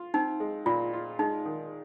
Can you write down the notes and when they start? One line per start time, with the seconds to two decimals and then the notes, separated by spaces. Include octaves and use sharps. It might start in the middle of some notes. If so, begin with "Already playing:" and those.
Already playing: F4
0.14 C4 D#4
0.40 G#3
0.66 A#2 F4
0.93 F4
1.19 G#3 D#4
1.45 D#3